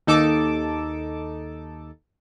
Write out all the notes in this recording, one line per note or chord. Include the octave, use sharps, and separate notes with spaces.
D#2 D#4 A4 A5 D6